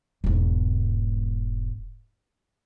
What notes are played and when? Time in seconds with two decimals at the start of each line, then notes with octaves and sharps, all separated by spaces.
0.24 E1 G#2